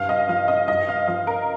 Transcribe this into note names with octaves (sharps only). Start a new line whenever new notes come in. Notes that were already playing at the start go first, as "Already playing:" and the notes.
Already playing: G2 F5
D#5
F3 F5
D#5
G2 D#5
F5
F3 D#5
A#4